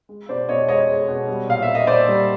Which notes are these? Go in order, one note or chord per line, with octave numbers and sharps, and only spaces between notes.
G#3
B2 C5 D5
B2 C#5 D#5
G#3 C#5 D#5
G#3
B2
G3
A#2 F5
E5
A#3
D#5
A#2 C5 D5
G3